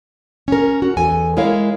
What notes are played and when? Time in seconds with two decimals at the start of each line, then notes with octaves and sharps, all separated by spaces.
0.48 C#4 A#4
0.82 F#4
0.97 E2 A4 G#5
1.37 G#3 E4 A#4 C#5 F5